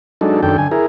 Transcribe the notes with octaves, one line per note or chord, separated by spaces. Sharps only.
F#3 G#3 D4 D#4 A4
F#2 D#3 D4 A4 G5
D3 G#5
E4 G#4 A#4